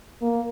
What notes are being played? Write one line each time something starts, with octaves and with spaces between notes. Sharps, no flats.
A#3